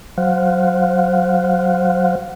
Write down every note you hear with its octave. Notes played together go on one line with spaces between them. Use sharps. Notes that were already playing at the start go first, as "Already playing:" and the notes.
F#3 C5 F5 F#5